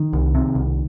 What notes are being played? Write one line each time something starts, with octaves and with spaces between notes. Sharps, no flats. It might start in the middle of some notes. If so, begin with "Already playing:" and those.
Already playing: D#3
C2
C3
C2